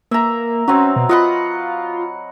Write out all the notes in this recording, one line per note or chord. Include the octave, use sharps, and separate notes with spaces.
A#3 E5 A#5
F#3 C4 C#4
B2
F4 D#5 F#5 B5